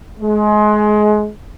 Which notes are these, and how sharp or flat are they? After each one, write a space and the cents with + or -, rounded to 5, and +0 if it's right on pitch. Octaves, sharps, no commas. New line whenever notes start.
G#3 +25